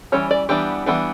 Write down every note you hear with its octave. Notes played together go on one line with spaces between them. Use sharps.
E3 G3 C#4 C#5
D5
E3 G3 B3 D4 G4
E3 G3 B3 D4